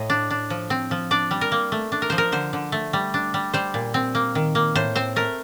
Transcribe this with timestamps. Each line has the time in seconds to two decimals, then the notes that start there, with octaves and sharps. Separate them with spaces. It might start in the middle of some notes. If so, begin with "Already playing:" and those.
Already playing: A2 D#5
0.10 D4
0.30 D4
0.50 F3
0.70 C4
0.91 F3
1.11 D4 D5
1.31 G3
1.41 A#4
1.52 A#3
1.72 A3
1.92 D4
2.02 A#4
2.10 F3 C5
2.18 A#4
2.32 D3 C5
2.53 D3
2.72 A3
2.93 G3
3.14 D4
3.34 G3
3.53 G3 C5
3.74 A#2
3.94 C4
4.15 A#3
4.35 D#3
4.55 A#3
4.75 A2 C5
4.96 C4 C5
5.16 A3 A#4